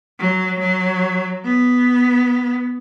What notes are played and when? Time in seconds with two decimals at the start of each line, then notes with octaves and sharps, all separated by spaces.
0.19 F#3
0.59 F#3
1.45 B3